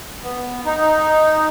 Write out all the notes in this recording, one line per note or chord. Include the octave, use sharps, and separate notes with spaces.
B3
D#4